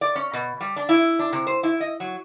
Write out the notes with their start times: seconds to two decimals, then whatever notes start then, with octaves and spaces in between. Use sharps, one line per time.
0.01 D5
0.15 C#4
0.33 B2
0.60 G3
0.76 D4
0.89 E4
1.19 D4
1.32 C3
1.47 C5
1.63 E4
1.80 D#5
2.00 F#3